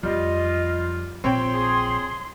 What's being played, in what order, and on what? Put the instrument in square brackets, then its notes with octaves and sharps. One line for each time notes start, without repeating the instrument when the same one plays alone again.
[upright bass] F2 [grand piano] G3 [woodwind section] F4 [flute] D#5
[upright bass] A#1 [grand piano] C4 C#5 G5 [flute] C6
[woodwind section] G#4